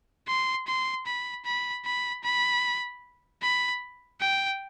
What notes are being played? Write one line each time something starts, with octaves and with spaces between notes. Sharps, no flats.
C6
C6
B5
B5
B5
B5
B5
G5